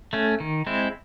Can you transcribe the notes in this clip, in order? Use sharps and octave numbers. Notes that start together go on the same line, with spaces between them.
A3 C#4
D#3
G#3 C4 E4